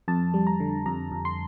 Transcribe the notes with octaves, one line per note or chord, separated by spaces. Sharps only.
F2 A5
G3
A#5
D3
F2 A#5
F2
C6